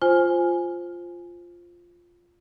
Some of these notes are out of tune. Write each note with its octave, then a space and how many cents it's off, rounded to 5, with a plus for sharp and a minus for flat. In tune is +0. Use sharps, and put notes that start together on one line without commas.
F4 +0 C5 +0 G#5 +5